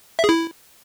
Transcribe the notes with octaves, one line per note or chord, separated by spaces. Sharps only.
E5
G#4
E4